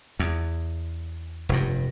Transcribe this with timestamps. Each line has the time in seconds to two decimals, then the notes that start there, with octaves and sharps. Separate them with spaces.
0.19 E2
1.49 F1 G2